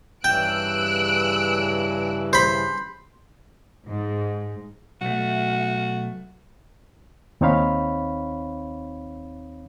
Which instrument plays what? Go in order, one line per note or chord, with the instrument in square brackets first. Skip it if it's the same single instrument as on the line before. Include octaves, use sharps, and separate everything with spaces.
[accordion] G2 C#3 E3 [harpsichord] G5 [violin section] E6 F#6 D7
[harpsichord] C5 B5
[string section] G#2
[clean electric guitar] B1 A3 [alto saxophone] F#4
[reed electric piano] D#2 C4 D#4 C#5 F5 B5